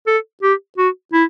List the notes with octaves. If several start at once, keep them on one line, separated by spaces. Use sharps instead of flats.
A4
G4
F#4
E4